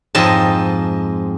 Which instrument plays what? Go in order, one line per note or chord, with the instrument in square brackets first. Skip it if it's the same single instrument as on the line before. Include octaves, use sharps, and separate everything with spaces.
[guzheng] F2 G#2 D#5 A5